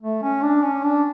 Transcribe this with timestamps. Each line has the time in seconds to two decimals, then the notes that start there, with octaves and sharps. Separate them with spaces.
0.02 A3
0.23 C#4
0.42 D4
0.63 C#4
0.84 D4